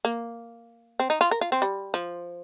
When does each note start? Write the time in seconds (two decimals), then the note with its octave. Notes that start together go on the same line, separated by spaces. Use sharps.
0.05 A#3
1.00 C4
1.10 D#4
1.21 F4
1.31 A#4
1.41 F4
1.52 C4
1.62 G3
1.94 F3